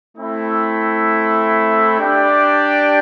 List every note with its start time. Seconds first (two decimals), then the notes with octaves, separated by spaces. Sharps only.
0.16 A3 C4 E4
1.98 D4 G4 D5 G5